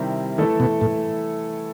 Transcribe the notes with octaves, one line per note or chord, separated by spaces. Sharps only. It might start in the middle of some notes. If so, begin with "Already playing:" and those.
Already playing: C3 D#3 G3 C4 E4
D#3 E3 A3 E4 A4
B2
A2